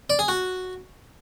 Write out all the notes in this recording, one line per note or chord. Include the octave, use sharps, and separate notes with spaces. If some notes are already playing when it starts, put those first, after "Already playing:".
D5
G#4
F#4